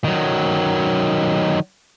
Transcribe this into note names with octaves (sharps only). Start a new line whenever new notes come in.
D#3 F#3